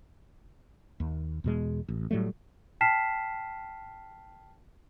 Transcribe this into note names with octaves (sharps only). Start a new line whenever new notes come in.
D#2
E2 B2 G#3
A1
A2 F#3 G3 A3
G5 A5 F6 B6 C7 E7